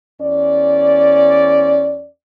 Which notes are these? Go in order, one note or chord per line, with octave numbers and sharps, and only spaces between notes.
E2 C#4 D5